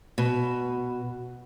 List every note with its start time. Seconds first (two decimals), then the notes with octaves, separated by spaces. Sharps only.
0.18 B2